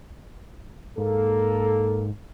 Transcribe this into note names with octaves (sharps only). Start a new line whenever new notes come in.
G#2 A#3 A4